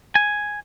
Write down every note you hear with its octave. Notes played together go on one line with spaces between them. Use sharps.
G#5